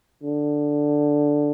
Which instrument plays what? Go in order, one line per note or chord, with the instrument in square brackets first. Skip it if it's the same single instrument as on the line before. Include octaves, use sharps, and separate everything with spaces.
[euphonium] D3